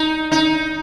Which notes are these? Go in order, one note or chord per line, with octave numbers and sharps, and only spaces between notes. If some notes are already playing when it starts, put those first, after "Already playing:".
Already playing: D#4
D#4